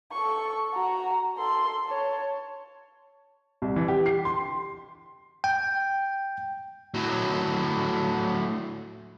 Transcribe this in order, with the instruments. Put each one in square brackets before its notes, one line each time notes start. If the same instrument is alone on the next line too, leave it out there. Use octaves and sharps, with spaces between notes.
[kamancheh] A4 C#6
F#4 A#5
A4 C6
C#5 A5
[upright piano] C2
E3
G4
C7
C6
[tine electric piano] G5
[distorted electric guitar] A2 F#3